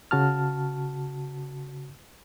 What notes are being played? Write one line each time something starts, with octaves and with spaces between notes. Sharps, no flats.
C#3 F#4 A5 F6